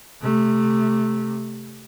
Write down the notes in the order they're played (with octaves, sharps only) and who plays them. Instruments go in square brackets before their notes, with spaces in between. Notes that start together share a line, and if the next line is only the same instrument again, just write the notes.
[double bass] C3 A3